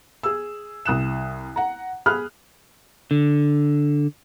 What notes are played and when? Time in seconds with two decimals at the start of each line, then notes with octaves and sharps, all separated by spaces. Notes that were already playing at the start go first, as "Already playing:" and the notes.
0.23 G#4 E6
0.85 C2 D#6 F#6 E7
1.56 F#5 A#5
2.06 G#4 B5 D#6 F6 F#6
3.11 D3